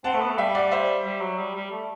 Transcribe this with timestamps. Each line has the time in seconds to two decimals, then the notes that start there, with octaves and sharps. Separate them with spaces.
0.04 C4 F#5 A5
0.14 A3
0.21 B3
0.31 A3
0.38 G3 E5 G5
0.55 D5 F#5
0.71 C5 E5
1.05 G3
1.21 F#3
1.39 G3
1.55 G3
1.71 A3